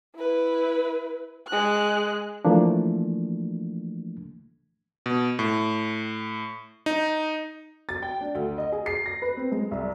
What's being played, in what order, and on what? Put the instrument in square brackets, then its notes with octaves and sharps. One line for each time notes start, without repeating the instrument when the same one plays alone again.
[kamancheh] E4 B4
G#3 F#6
[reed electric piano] E3 F3 A3 A#3 D4
[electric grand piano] B2
A2
D#4
[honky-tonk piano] A6
G5
D4
D2
D#5
G#4
C7
A#6
B4
C4
G#3
C2